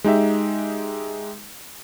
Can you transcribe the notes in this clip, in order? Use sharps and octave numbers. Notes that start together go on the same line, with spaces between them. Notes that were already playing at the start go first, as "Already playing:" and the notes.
G#3 D#4 G4 E5